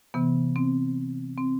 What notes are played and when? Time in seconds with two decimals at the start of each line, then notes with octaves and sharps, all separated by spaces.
0.14 C3 E3 B3
0.56 C4
1.37 C4